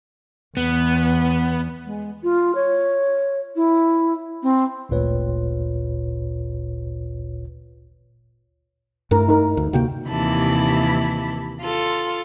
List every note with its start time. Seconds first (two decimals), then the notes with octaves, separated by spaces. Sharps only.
0.57 E2 B3
1.86 G#3
2.23 F4
2.55 C#5
3.56 E4
4.43 C4
4.89 G#1 D2 A#2 F4 B4 C#5
9.11 G2 A3 E4 A#4
9.28 D#4 A#4
9.57 D2
9.73 D2 C3 A#3 F#4 G5
10.09 D#2 C3 E3 E4 A5 B5
11.60 F4 A4